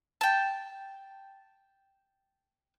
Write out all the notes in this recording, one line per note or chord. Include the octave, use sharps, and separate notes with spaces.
G5 A5